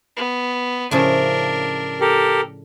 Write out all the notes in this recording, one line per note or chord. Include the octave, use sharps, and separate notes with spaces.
B3
A2 C#3 F3 D4 A#4
G4 A4 A#4